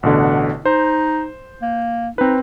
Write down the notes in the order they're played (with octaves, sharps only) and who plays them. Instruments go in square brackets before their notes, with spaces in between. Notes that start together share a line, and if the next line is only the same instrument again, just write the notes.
[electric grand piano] A1 B2 D3 [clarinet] F#5
[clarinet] D#4 [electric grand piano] C5
[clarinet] A#3
[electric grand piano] C4 B4 [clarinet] D#4